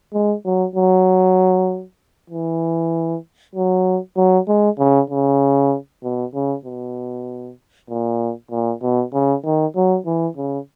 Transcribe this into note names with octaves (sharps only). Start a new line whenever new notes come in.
G#3
F#3
F#3
E3
F#3
F#3
G#3
C#3
C#3
B2
C#3
B2
A#2
A#2
B2
C#3
D#3
F#3
E3
C#3